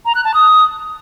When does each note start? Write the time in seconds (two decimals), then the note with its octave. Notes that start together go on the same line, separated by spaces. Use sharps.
0.05 A#5
0.15 F#6
0.24 A5
0.34 D#6